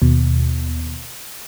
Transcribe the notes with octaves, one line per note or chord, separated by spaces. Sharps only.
D#2 B2